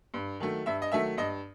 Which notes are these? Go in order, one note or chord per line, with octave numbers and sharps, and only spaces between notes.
G2
D#3 F#3 A3
G2 E5
D#5
D#3 F#3 A3 E5
G2 D#5